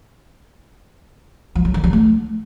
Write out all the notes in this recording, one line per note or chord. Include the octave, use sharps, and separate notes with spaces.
F3
F#3
D#3
F#3
A3